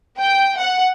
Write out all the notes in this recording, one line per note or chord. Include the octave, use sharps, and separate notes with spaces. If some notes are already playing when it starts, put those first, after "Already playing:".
G5
F#5